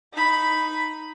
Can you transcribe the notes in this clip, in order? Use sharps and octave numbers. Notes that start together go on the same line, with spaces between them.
D#4 B5